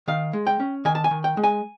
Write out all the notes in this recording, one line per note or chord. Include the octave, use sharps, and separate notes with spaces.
D#3 F5
G#3
G5
C#4
D#3 G#5
A5
G#5
D#3
G5
G#3
G#5